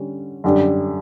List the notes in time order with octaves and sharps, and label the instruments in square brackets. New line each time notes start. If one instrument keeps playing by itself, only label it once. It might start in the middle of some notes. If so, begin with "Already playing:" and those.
Already playing: [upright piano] D3 G3 C#4
F#2 D3 G3 D4 G4